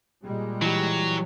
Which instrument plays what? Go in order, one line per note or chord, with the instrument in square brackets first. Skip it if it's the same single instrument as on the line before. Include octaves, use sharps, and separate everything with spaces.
[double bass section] A#2 G3 G#3
[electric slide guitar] E3 G4 [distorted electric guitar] F#3